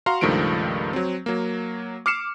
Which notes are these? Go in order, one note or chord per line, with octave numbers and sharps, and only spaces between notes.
F#4 F5 A#5 C6
C#2 G2 D#3 F3 A3 D7
F#3 C4
F#3 A#3
D6 F6 C7 C#7 E7